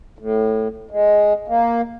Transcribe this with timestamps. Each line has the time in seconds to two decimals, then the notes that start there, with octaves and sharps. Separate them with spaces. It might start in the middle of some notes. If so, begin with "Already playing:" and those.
0.19 A2
0.91 G#3
1.48 A#3